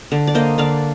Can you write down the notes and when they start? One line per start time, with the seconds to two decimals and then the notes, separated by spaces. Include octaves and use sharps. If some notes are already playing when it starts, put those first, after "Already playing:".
0.12 D3
0.27 D5
0.35 A#3 C5 D#5
0.58 D3 D5 F5